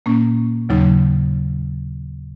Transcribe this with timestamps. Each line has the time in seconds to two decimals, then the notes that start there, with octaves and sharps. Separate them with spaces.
0.06 A#2 A#3 C#4
0.69 D#2 C#3 F#3 D#4